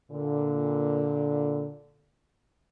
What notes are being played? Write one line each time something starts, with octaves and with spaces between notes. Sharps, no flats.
A#2 D3